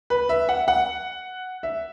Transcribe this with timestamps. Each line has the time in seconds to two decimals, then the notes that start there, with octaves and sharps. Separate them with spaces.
0.10 B4
0.29 E5
0.49 F#5
0.68 F#5
1.63 E5